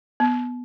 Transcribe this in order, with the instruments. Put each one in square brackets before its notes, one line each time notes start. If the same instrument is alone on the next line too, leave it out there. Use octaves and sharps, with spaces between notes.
[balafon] B3